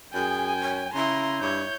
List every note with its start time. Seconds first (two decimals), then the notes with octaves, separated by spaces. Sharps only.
0.14 F#2 G#4 G5 G#5
0.61 C#5
0.94 C#3 E4 A#5 C6
1.42 G2 C#5 G6